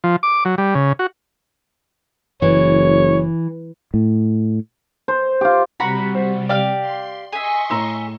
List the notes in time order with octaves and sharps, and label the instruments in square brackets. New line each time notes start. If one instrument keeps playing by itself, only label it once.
[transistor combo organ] F3
D6
F#3
G3
C#3
F#4
[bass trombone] F#1 [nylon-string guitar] E3 [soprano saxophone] C#5
[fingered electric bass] A2
[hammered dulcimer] C5
F4 G4
[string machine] C3 G3 [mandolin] F#4 F#5 B5 [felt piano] A#5
[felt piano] C5
[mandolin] G4 F5 [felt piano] D5
[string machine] C6
[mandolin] G#4 E5 [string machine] D#5 C6 C#6
[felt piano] A2 A#5 E6